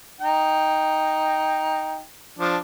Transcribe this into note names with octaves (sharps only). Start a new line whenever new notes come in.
D#4 G5
F3 D4